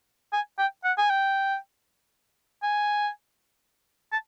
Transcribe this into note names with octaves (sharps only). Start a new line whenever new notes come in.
G#5
G5
F#5
G#5
G5
G#5
A5